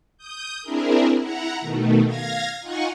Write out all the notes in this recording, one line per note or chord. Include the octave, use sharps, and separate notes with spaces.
D#6 G6
C4 D4 E4 G#4 A#4
E4 F#5 A#5
B2 D#3 A3
F5 G#6 A#6
D#4 F4 F#5 G#5 C#6